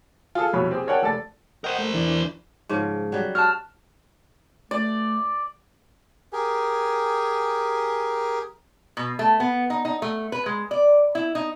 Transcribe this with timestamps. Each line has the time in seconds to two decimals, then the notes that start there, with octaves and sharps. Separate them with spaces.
0.35 F4 G#4 A4
0.53 C2 F2 B2 C#5 B5
0.71 C4 G4 G#4
0.87 A#4 C#5 D5 F#5 G5 A5
1.02 F1 A4 D5 A6
1.64 A#4 C5 D#5 F#5 G5
1.78 A3
1.93 E2 E3 D4
2.69 G#2 C#3 F3
3.12 F#3 G3
3.35 F#4 F5 A5 F6
4.71 A3 D5
6.33 G4 G#4 A#4 G#5
8.97 B2
9.19 A3
9.40 B3
9.70 D#4
9.85 D#4
10.02 A3
10.32 B4
10.46 G#3
10.71 D5
11.15 E4
11.35 D#4